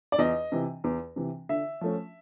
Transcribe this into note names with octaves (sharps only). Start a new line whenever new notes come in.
D5
E2 D#5
C3 E3
E2
C3 E3
D3 E5
F3 A3 C#4